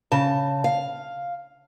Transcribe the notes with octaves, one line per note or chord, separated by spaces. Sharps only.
C#3 A5
F5